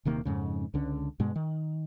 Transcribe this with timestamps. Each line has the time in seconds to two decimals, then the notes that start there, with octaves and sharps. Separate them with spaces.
0.05 D#1 C3 D#3 A#3
0.25 F2 G#2 C#3
0.74 C#2 D3 C#4
1.20 G2 B2 G#3
1.36 D#3